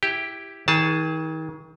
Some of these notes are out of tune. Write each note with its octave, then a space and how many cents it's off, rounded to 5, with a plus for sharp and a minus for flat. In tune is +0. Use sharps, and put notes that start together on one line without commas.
E4 +0 G4 +0 G5 +0
D#3 +40 G#4 +0 A5 +0